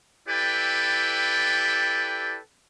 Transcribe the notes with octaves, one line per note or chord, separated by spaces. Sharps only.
E4 G4 A4 B4 D5 G5